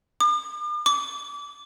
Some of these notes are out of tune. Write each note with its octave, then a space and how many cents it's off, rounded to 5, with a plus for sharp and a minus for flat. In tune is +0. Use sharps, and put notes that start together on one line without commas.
D6 +45
D6 -25